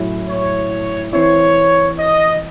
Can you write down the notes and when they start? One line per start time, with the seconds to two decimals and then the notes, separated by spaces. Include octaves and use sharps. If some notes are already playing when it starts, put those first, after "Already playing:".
Already playing: A2 F#3 C#4 E4
0.29 C#5
1.13 E3 C4 E4 C#5
1.98 D#5